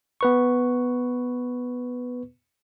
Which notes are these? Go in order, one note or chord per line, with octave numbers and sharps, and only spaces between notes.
B3 B4 C#6